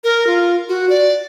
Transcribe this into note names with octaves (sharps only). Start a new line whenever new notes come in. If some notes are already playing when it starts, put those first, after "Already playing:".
A#4
F4
F#4
D5